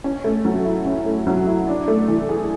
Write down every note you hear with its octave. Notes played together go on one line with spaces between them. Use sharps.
C#4
A3
F#3
E4
C#4
A3
F#3
E4
D4
A3
E3
G#4